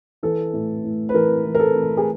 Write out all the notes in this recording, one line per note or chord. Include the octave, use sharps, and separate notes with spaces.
E3 A4
A2
A2
B4
E3 A#4
E3
A#4
A4
E3
G#4